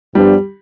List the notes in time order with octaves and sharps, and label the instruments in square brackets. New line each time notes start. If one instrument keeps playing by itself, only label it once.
[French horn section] G2 F3 B3 D4 [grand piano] G3